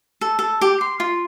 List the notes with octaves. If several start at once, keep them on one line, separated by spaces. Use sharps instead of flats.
A4
A4
G4
C6
F4